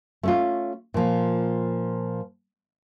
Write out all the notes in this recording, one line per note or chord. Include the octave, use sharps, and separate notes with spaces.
A3 C#4 F4
A#2 F3